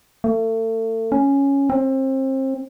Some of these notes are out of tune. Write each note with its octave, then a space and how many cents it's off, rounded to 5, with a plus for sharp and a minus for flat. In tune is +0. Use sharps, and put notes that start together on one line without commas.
A3 +35
C#4 +0
C4 +30